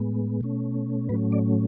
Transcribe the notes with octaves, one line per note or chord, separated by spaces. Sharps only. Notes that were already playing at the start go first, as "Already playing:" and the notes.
Already playing: A2 G#3 B3
B2 A3 C#4
A2 F#3 A3 C#4 B4
D5